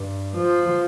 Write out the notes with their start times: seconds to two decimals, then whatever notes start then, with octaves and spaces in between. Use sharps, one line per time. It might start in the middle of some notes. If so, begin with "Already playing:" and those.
Already playing: G2
0.37 F3